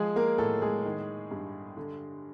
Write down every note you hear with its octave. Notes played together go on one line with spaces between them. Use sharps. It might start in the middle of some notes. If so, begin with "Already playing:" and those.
Already playing: F3 G#3 G#4
A#3 A#4
A2 A3 A4
G#3 G#4
D#3
G2
D3